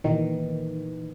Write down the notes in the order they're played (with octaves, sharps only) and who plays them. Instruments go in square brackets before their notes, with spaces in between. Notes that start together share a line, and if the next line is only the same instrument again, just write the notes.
[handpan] A#2 E3 [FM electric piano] D#3